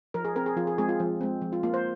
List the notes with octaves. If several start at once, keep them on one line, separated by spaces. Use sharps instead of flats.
F3 A#4
G#4
C4 A#4
G#4
F3 F4
G#4
G#3 C4 G#4
F4
F3
G#3 C4
F3
F4
A#3 F4
C5